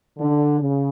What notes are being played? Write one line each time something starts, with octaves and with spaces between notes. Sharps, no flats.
D3
C#3